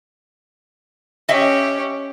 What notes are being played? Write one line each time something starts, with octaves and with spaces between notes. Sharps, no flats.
C#4 G4 D#5 E5